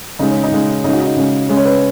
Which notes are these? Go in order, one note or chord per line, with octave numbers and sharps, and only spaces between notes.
C#3 G#3 D#4
C#4
D#4
C#3 G#3
C#3 G#3 D#4
F#4
D#4
C#3 G#3
C#3 G#3 C#4
C#5
B4